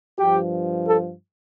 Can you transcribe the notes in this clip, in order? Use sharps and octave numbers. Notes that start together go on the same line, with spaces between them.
G2 F3 G4
A4